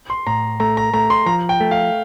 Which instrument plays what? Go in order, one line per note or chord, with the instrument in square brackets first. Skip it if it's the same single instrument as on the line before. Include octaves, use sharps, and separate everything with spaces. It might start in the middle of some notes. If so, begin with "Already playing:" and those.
[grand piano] C6
[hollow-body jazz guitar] A2 [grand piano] A#5
[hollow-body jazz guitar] A3 [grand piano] A#5
[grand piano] A#5
[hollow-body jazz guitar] A3 [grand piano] A#5
[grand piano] C6
[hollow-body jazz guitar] F3 [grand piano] A#5
[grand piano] G5
[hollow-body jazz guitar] A3
[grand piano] F5